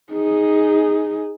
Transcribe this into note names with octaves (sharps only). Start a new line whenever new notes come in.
D#4 G#4